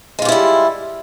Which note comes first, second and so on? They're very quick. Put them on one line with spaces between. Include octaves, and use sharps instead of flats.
G#3 F4 G4 E4 G3